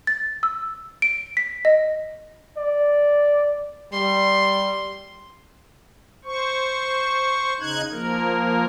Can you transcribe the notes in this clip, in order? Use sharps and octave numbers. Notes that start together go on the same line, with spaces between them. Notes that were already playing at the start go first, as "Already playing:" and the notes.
A6
E6
D7
B6
D#5
D5
G3 C6
C5 C#6
C#3 D#4 F#6 G#6
F3 A#3 A#4